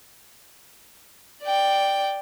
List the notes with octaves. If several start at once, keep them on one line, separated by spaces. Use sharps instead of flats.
D5 G5